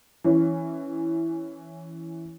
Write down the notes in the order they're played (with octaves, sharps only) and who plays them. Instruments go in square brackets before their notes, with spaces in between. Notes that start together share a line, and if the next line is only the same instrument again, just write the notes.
[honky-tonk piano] E3 C#4